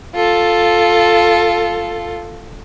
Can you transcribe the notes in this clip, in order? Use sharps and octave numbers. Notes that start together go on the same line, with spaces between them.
F4 A4